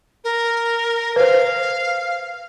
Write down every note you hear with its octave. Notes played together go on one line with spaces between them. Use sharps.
A#4
B4 C5 F5